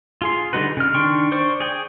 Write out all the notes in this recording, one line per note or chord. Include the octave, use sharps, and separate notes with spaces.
F4 G#4 C6
D3 G3 D#4 F#4 B4
C#3 F6
D#3 D4 G5 C6 C#6
C5 D5 C#6
G#4 G5